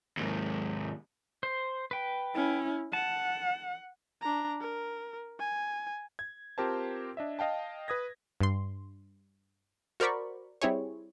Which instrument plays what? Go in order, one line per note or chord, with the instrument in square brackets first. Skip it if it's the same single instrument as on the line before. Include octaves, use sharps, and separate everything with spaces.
[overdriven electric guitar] D#2 G#2
[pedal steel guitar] C5
B4 G5
[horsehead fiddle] C#4 E4
[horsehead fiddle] F#5 [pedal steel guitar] A5
[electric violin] D4 A#5
A#4
G#5
[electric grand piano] G#6
C4 F4 G4 A#4 C5 A5
D4 D#5 E5
D#5 F5 G5 A5
B4 D#6 G#6 A#6
[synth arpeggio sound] G2 C6
F#4 A#4 C5 D5 B5 C#6
G3 C4 E4 G#4 C#5